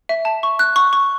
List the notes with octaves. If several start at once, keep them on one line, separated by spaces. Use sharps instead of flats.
E5
A5
C#6
F#6
C#6
C#6